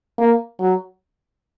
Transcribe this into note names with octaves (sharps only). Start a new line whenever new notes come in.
A#3
F#3